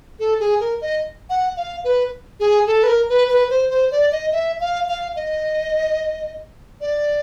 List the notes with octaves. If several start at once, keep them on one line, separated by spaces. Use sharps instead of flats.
A4
G#4
A#4
D#5
F#5
F5
B4
G#4
A4
B4
A#4
B4
B4
C5
C5
D5
D#5
E5
F5
F5
D#5
D5